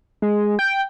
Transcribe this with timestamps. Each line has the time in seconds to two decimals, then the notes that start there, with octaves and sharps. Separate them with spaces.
0.22 G#3
0.59 G5